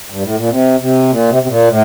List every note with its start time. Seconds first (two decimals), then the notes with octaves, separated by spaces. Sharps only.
0.10 G2
0.23 A2
0.36 A#2
0.50 C3
0.80 C3
1.09 A#2
1.29 C3
1.43 C3
1.48 A#2
1.68 A2